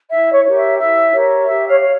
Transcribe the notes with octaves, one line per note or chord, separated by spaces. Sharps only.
E4 E5
C#5
G4 A#4 C#5
E5
E4 E5
G4 A#4 C#5
G4 E5
C#5 F5
C#5